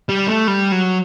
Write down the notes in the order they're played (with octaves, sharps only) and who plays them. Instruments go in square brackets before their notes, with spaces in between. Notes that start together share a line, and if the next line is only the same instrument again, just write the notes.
[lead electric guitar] G3
A3
G3
F#3